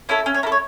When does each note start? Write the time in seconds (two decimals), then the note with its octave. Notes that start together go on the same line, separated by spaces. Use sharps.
0.09 C#4 E4 A4
0.26 C#4
0.34 C#5
0.43 E4 A#4
0.47 A4
0.52 C#5